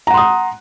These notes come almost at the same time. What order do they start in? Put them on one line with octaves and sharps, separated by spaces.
A#5 F#5 C6 D#6